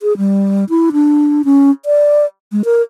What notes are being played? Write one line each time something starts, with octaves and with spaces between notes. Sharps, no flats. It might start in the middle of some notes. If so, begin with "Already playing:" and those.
G#4
G3
E4
D4
C#4
D5
G#3
A#4